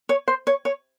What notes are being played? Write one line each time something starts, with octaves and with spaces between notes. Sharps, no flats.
C#5
C5
C#5
C#5